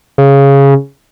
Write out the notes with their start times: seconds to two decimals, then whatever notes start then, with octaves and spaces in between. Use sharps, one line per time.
0.18 C#3